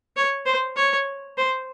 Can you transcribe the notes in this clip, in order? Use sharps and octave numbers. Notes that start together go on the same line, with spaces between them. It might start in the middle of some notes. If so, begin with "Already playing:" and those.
C#5
C5
C#5
C5